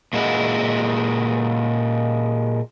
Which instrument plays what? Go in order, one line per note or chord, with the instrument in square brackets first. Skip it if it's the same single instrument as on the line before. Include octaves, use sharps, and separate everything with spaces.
[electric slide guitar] A#2 G#3 E4 F#4